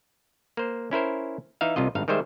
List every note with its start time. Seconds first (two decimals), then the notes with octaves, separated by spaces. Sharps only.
0.57 A#3 C5
0.91 C#4 E4 A#4 C5
1.61 E3 D#4 E5 F5
1.76 C2 C3 F4 D#5
1.95 G#1 G2 D#4 F5
2.08 D#3 G3 G#3 C5 E5